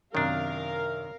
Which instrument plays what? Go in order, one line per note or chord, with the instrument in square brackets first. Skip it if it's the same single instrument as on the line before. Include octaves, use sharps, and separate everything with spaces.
[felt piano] F#2 C3 [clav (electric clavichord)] D#3 D4 [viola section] A#4 F5